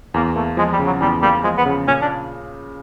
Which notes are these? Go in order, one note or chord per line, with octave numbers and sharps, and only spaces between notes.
E2 A#3
A3 A#3
F3 G#3
G3
C#3
F#3
E2 G3
G3 A#3
F3 G#3
B3
C#3
A#2 C#4
D4